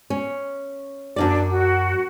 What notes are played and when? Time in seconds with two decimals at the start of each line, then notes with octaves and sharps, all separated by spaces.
0.10 C#4
1.16 F#2 A#2 D4 D5
1.48 F#4